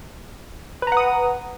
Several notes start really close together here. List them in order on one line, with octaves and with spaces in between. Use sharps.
B4 A#5 F#5 D#6